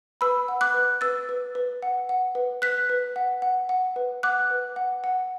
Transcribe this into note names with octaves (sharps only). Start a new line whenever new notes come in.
B4 B5 E6
F#5
D6 F#6
B4
B4 E6 A6
B4
B4
F#5
F#5
B4
B4 F#6 B6
B4
F#5
F#5
F#5
B4
F#5 D6 F#6
B4
F#5
F#5